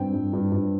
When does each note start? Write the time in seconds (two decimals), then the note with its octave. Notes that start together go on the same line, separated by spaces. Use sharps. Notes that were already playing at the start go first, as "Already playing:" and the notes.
Already playing: G2 C4 G5
0.14 G2
0.33 G2
0.52 G2